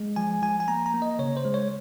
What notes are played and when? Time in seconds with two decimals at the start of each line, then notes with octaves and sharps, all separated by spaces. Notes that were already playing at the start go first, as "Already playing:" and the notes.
Already playing: G#3
0.16 F3 G#5
0.42 F3 G#5
0.60 G#5
0.68 A#3 A#5
0.86 A#5
0.94 A#3
1.02 D#5
1.19 C#3 C#5
1.37 C5
1.45 G#3
1.54 C#5